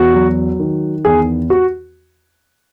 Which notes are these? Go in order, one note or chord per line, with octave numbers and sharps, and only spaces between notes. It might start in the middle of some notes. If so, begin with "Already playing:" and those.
Already playing: E2 F#4
F#3
D#3
E2 G#4
F#4